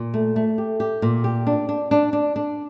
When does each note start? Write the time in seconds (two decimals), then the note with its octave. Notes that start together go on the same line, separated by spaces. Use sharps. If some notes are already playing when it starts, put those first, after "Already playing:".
Already playing: A#2
0.14 A3
0.36 A3
0.58 G4
0.80 G4
1.02 A#2
1.24 G4
1.47 D4
1.69 D4
1.91 D4
2.13 D4
2.36 D4